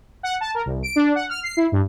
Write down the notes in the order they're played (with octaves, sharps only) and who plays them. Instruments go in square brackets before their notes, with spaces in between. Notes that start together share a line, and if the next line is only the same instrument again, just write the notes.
[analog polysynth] F#5
A5
A#4
C2
D7
D4
F#5
F6
C7
E4
G2